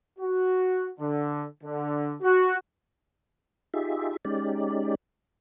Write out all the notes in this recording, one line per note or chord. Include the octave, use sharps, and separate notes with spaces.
F#4
D3
D3
F#4
D#4 F4 G4 G#4 E5
G#3 C#4 D#4 G4 D5